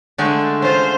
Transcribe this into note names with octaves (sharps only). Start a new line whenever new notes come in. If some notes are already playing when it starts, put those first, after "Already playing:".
D3 G#3 A3
C#4 F4 C5